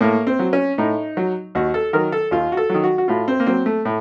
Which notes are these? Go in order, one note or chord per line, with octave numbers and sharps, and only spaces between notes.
A2 A#3
C4
F#3
C#4
A2 D#4
F#3
D#2 F#4
A4
D#3 F#3 A#4
A4
D#2 F4
F#4
A4
D#3 F#3
F#4
F#4
A2 F4
C4
A#3
F#3 C4
A3
A2